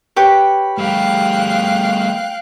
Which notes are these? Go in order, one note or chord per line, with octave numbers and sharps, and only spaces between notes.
G4 B4 C#5
G3 A3 F5 G5 F#6